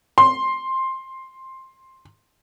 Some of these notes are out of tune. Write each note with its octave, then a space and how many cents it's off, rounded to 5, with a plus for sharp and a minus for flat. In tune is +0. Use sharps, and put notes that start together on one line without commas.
C6 +10